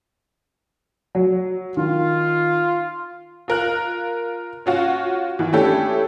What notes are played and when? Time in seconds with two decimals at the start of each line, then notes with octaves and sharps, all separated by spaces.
1.15 F#3
1.77 D#3 F4
3.48 F4 A#4 F#6
4.66 C#4 F4 F#4
5.39 D#3 E3
5.53 A3 C#4 D4 E4 G4 A4